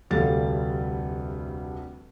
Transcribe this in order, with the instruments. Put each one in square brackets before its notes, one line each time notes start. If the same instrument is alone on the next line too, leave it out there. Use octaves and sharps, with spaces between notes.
[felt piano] F1 D2 G3 A3 F5 A6